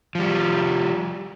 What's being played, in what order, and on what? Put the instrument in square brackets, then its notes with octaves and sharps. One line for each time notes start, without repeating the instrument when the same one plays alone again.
[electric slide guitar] F3 G3